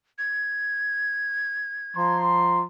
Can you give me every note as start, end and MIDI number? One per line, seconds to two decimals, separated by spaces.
0.18 2.18 92
1.97 2.64 53
1.97 2.64 82
1.97 2.64 84